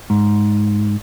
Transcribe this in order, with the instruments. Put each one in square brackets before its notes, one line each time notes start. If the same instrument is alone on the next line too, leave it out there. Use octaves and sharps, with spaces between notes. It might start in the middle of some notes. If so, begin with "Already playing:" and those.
[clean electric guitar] G#2